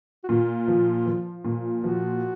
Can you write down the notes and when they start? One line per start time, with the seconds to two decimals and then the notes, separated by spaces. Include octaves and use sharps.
0.24 F#4
0.28 A#2 F4
0.68 F3
1.06 F3
1.45 A#2
1.84 F3 F#4